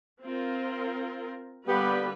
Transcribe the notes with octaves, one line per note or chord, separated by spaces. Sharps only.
C4 F4 A#4
D3 G3 A#3 B3 G4 B4